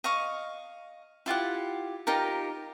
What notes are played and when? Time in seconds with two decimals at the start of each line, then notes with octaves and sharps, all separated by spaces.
0.04 D#5 F5 C#6
1.26 E4 F4 G4 F#5
2.07 D#4 F4 G4 A#4